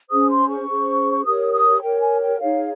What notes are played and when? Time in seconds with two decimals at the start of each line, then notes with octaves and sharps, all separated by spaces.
0.10 C#4 G#4 C5 D#6
0.30 C6
0.49 C#6
0.68 C#4 G#4 C5
1.24 G4 A#4 C#5 D#6
1.53 D#6
1.81 G4 A#4 C#5 G5
2.01 G#5
2.20 G5
2.39 D#4 G#4 C#5 F5